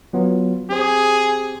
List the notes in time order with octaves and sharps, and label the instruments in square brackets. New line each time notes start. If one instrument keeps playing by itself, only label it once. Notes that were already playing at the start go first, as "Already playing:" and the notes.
[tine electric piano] F#3 B3 F4
[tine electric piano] C4 G4 C5 [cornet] G#4